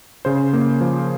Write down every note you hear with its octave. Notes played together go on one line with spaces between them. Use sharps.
C#3 C5
A#3
F3